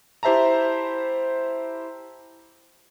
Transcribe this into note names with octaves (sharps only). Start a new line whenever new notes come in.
E4 G4 C5 E5 A5 A#5